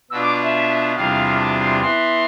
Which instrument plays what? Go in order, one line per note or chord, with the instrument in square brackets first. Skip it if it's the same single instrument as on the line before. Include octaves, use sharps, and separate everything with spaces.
[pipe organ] B2 B3 D4 F4 [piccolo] E6
[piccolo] D6
E5
E5
[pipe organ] E2 C3 G3 D4 F4 [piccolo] F5
[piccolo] A5
C6
[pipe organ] E3 B3 E4 [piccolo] C6